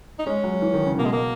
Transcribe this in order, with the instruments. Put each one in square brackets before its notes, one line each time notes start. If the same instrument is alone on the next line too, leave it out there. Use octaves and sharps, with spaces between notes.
[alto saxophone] D#4
[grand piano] G#3 [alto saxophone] C#4
[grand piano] F#3
E3
D#3
C#3
[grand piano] B2 [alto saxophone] A#3
[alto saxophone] G#3
A#3